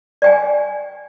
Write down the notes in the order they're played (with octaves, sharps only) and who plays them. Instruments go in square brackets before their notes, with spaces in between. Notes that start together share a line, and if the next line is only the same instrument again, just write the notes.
[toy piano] D5 G5 G#5